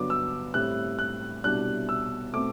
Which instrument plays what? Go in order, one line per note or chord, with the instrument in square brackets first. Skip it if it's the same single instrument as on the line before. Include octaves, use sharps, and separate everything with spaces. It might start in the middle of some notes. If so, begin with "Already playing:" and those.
Already playing: [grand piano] G2 D3 F#3 B3 D4 D6
E6
A2 G3 C4 F#6
F#6
C2 B2 G3 D4 F#6
E6
B2 A3 C4 D6